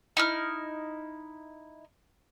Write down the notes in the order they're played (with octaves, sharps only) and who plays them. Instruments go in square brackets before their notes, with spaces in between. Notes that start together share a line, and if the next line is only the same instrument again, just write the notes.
[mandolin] D#4 E4 F6